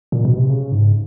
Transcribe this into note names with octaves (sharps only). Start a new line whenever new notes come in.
A#2
B2
C3
C#3
G#2